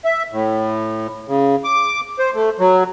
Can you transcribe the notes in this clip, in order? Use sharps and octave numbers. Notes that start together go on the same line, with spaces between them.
E5
A2
C#3
D6
C5
A3
F#3